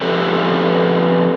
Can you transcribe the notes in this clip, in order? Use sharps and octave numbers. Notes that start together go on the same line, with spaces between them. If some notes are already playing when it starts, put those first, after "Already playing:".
F3 C4 G4 A4 B4